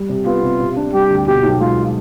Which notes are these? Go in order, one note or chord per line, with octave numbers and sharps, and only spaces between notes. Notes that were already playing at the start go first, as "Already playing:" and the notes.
Already playing: G3
C3
B3 F4
C3
C3
D4
G3 G4
D2
B2 G4
B1
G#3 F4